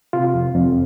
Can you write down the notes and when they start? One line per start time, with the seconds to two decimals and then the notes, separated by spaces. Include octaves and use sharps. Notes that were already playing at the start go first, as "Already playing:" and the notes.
0.13 C3 F4
0.34 F2
0.54 F2